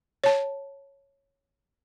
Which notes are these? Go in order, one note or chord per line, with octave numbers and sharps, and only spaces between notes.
C#5 A5